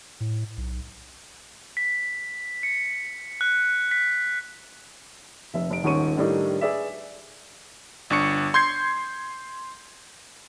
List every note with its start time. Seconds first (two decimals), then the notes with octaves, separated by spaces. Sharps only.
0.20 A2
0.57 B1
1.77 B6
2.63 C#7
3.41 F#6
3.91 B6
5.54 F1 E5
5.70 F1 D7
5.84 D#1 G#2 C#4 C#6 D#7
6.17 A2 D#3 G3 D4 D#4 A4
6.61 G#4 B4 D5 E5
8.10 G1 D4 C#6 C#7
8.54 C6 G6 G#6 C7